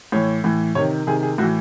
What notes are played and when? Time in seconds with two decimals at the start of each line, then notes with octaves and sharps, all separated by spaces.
0.12 A2 E3 C#5
0.44 A2 E3
0.75 C3 D#3 C#5
1.07 C3 D#3 G#4
1.23 G#4
1.38 A2 E3 F#4